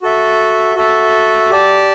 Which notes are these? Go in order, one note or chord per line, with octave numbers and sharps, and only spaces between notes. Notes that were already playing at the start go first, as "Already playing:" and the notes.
F#4 A4 E5
F#4 A4 E5
G4 D5 A5